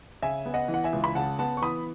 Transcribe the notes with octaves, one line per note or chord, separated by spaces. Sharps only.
C#3 E5 G#5
B3
D#5 F#5
E3
F#5
E5 G#5
C#2
B5
C#3 F#5 A5
B3 F#5 A5
C#6
E3 B5 D#6